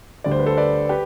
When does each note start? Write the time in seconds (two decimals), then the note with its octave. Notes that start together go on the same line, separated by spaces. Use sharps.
0.24 D2 D3 G3 D5
0.32 C5
0.39 B4
0.46 A4 C5
0.57 B4 D5
0.89 G4 B4